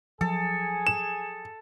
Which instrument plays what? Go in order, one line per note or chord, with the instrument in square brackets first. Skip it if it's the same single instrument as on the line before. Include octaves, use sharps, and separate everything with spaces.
[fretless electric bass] F3 F#3 [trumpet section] G#4 G#5 [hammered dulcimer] A4
[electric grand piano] E7